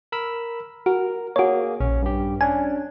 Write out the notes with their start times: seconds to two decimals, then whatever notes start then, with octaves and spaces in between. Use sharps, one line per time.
0.12 A#4 B5 E6
0.86 F#4 A#4
1.36 A#3 F#4 G#4 C#5
1.80 A#1 C#4
2.02 G2 G4
2.41 C#4 D4 G#5